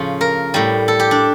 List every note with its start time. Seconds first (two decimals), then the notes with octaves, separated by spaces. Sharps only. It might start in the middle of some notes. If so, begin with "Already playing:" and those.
Already playing: A2 C#3 F3
0.21 A#4
0.54 A2 G3
0.88 A4
0.99 G4
1.11 D4